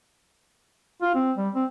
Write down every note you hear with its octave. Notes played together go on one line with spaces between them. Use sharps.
F4
C4
G3
C4